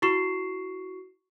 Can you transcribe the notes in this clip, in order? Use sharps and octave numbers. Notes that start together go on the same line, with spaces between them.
E4 F#4 C#6 C7 E7